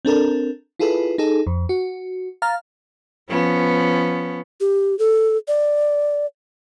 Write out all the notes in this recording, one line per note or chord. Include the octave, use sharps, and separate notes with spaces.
C4 D4 A4 A#4
E4 F4 G#4 A4 B4
D#4 G#4 A4
F2
F#4
F5 A#5 F6 A6
F3 B3 C#4
G4
A4
D5